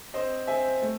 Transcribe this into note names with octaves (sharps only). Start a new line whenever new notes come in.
C4 C5 D#5
C4 E5 G#5
A3